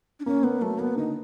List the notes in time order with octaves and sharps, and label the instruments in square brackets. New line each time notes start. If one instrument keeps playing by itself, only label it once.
[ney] D4
[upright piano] A#3 [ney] C#4
[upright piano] A#3 [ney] B3
[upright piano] F#3 [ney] A3
[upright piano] A#3 [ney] B3
[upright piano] D3 [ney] D#4